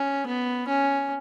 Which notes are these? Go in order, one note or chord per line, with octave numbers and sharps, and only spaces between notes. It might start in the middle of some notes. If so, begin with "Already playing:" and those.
Already playing: C#4
B3
C#4